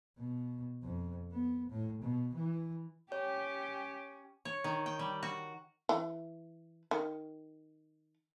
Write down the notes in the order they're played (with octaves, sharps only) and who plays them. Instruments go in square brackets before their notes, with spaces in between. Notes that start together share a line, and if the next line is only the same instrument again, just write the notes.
[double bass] B2
F2
B3
A2
B2
E3
[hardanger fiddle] C#4 [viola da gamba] G4 [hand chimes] C#5
[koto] C#5
D#3
G5
G3
F#4
[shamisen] E3
D#3